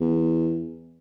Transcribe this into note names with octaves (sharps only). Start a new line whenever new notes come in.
E2